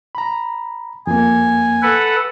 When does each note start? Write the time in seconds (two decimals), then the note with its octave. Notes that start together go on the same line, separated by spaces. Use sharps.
0.15 A#5 B5
1.07 F2 A#3 G#5
1.82 A4 B4 F#5